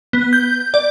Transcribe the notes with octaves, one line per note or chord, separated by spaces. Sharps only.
B3
G6
D5